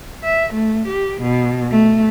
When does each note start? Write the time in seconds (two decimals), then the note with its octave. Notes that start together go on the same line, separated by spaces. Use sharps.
0.24 E5
0.53 A3
0.87 G4
1.21 B2
1.71 A3